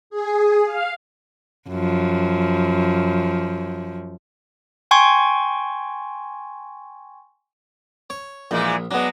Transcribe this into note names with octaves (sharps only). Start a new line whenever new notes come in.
G#4
F5
F#2 F3
G5 G#5 C6 C#6 G#6
C#5
A#1 A#2 E3 G#3
F#3 G#3 B3 D4